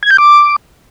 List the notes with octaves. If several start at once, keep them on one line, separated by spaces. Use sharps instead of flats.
G#6
G6
D6